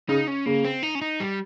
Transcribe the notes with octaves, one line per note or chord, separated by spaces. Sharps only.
C#3 D#4
C#4
C#3 A#3
C4
D#4
C#4
D#4
G3